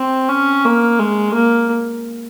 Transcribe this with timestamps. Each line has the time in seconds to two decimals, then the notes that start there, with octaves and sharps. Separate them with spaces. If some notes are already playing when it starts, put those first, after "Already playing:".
Already playing: C4
0.29 C#4
0.65 A#3
0.99 G#3
1.34 A#3